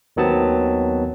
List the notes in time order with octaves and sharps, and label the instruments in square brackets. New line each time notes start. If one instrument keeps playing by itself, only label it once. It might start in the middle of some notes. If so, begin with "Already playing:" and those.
[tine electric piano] D#2 D#3 F#3 B3 C4 A5